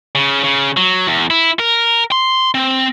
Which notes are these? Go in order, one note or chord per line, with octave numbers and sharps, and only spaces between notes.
C#3
C#3
F#3
E2
E4
A#4
C6
C4